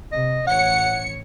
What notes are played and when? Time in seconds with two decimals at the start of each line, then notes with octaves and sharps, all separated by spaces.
0.12 C3 D#5
0.47 A1 C#5 F#5 C#7